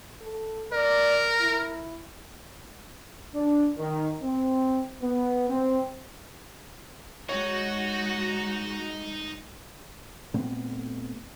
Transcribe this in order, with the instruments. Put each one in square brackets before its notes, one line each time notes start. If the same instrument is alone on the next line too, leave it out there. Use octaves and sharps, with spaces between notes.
[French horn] A4
[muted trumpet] A#4 [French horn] D5
[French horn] E4
[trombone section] D4
D#3
C4
B3
C4
[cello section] G#3 [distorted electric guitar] D#4 [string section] F#4 [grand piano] C#5
[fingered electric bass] A#2 A3 B3 C4